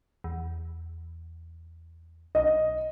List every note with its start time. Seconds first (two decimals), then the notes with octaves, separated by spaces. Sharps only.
0.24 E2
2.35 B1 D#5